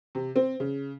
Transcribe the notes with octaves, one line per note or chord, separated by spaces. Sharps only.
C3
C4
C#3